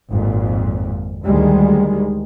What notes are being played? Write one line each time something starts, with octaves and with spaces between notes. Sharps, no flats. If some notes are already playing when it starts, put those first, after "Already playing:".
G#1 F2 A#2
D2 D#3 G3 G#3